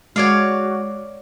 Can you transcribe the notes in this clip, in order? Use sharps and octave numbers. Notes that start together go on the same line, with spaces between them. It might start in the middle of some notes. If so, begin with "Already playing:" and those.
G#3 F#4 C#5 D5 F5